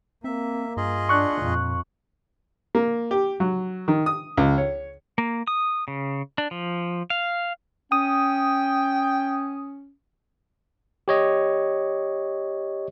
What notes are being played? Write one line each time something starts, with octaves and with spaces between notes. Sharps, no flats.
A#3 C4 E5
G2 F4 G#4 D#5
D4 C#6 F#6
F2 A#2
A#3
G4
F#3
D#3
D#6
C#2
C#5
A#3
D#6
C#3
D4
F3
F5
C#4 G5 D#6
G4 C#5 D#5